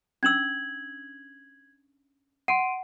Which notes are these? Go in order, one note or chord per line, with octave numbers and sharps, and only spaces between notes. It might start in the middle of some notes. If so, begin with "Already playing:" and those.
C#4 D4 E6 G#6 F#7
F#5 C6 D7 D#7